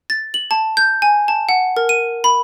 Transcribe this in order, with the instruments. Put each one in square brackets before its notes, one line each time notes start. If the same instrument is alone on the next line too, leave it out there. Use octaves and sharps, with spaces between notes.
[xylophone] A6
F#7
A5
G6
G#5
A5
F#5
A#4
D#7
B5